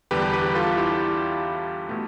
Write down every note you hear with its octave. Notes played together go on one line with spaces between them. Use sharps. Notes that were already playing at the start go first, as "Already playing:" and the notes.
E2 D3 G3 G4 B4
G4 B4
F4 A4
E4 G4
B2 A3